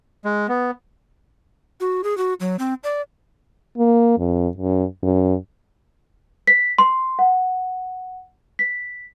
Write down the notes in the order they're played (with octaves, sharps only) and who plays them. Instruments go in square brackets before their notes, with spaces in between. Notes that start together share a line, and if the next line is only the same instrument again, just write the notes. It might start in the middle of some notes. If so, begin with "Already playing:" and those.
[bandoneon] G#3
B3
[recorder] F#4
G#4
F#4
F#3
C4
D5
[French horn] A#3
F2
F#2
F#2
[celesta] B6
C6
F#5
B6